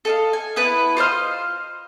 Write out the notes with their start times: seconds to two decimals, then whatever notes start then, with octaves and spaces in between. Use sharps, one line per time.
0.05 A4 D#5 F5
0.33 G#5
0.56 B3 E4 B4 A5
0.97 F4 C5 D#5 F6